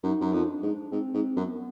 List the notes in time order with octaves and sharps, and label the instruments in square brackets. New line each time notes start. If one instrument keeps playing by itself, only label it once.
[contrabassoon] F#2 [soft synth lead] D#4
[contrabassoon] F#2
F2
[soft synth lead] D4
[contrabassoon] G#2
[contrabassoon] G#2 [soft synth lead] C4
[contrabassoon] G#2
[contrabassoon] F#2 [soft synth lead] B3